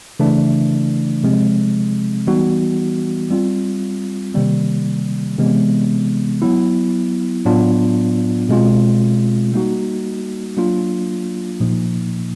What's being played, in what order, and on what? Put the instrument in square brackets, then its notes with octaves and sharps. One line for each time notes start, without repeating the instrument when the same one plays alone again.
[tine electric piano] C#3 E3 A3 D4
C3 F3 G#3 C4
E3 G3 B3 D#4 F#4
G3 C4 F4
C3 D#3 G3 A#3
C3 E3 G#3 B3
F#3 B3 E4
A2 F#3 B3 D4 F4
B2 G#3 C4 F4
G3 A#3 D#4 F#4
F#3 A#3 D4 F4
A#2 F3 A#3 D#4